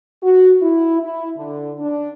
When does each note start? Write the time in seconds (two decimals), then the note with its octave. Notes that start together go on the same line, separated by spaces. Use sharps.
0.22 F#4
0.60 E4
1.00 E4
1.36 D3
1.79 D4